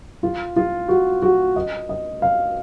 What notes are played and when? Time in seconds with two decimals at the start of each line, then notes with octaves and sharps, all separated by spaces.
0.23 F4
0.56 F4
0.88 F#4
1.22 F#4
1.56 D#5
1.89 D#5
2.22 F5